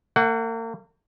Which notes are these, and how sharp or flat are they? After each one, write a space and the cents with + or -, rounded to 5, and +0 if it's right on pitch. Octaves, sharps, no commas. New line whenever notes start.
A#3 -40 F#5 +15